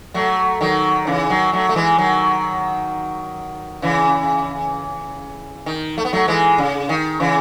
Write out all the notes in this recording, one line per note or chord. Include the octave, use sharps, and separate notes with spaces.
F#3 A3
D#3 F#3
C#3 E3
D#3 F#3
F#3 A3
A3
E3 G#3
D#3 F#3
C#3 E3
D#3
A3
B3
F#3 A3
E3 G#3
C#3
D#3
C#3 E3